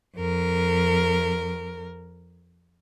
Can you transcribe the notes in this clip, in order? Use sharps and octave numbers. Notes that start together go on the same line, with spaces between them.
F2 A#4